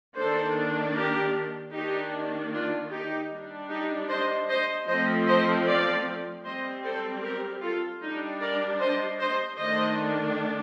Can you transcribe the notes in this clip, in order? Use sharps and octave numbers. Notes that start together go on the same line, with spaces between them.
D#3 A#3 D4 A4 C5
G4 A#4
D#3 A#3 D4 D#4 G4
D4 F4
D#4 G4
G3 D4
D#4 G4
C5 D#5
C5 D#5
F3 A3 C4 C5 D#5
C5 D#5
D5 F5
G3 C4 C5 D#5
A4 C5
G4 A#4
F4 A4
G3 D4 D#4
A#4 D5
C5 D#5
C5 D#5
D#3 A3 D4 C5 D#5